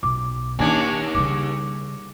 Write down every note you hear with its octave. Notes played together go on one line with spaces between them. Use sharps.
B1 D6
D#2 A#3 C#4 D4 G#5 G#6
C#3 G3 D6